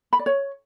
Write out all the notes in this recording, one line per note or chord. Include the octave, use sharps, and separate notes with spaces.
B5
D5
C#5